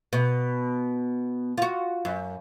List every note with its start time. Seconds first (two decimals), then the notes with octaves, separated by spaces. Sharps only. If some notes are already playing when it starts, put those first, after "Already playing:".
0.13 B2
1.58 F4 F#4
2.05 F#2